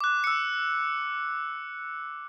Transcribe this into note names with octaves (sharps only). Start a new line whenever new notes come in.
D6 F#6
E6 C#7